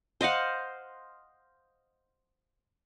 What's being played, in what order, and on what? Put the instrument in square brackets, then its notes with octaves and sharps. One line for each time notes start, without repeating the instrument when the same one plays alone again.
[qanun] C5 D#5 F5 F#5